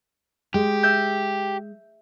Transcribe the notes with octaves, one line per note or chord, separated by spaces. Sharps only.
G#3 G4
E5 G6